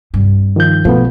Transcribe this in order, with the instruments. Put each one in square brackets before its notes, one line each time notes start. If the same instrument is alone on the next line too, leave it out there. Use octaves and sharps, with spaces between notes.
[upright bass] G2 C3
[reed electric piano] D#3 F3 G6
[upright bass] B2 [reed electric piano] F3 A3 B3